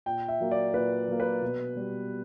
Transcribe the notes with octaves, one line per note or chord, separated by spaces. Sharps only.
A#2 G5
E5
F#3 A#3
D5
A#2 B4
F#3 A#3
B4
B2
G3 B3